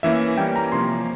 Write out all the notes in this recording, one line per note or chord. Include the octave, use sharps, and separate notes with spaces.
E3 A#3 C#4 E5
E3 G3 A#3 C#4 G5
A#5
C3 F3 A#3 C#4 C6